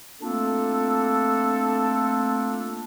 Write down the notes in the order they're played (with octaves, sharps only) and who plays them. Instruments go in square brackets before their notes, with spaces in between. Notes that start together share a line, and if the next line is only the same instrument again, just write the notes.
[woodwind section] A3 A#3 C4 D4 F4 A4